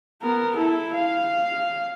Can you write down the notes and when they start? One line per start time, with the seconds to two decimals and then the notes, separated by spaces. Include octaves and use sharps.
0.22 B3 A#4
0.55 E4 A4
0.94 F5